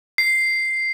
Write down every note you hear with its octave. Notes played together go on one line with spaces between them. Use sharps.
C7